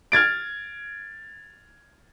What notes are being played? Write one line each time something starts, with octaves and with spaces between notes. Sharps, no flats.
F6 G#6 A6 D7